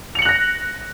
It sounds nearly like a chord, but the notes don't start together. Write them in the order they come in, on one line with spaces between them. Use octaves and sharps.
F7 C#7 F#7 F#6 A#6